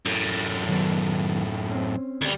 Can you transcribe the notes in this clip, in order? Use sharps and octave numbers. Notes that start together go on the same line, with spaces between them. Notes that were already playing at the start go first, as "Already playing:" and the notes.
F#2 A2
D#3 F#3 B3
C4 C#4
D2 G3